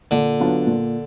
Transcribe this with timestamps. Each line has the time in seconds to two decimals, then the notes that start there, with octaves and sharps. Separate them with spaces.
0.11 A#2 D3
0.40 F#3 B3 D4 F4
0.67 A#2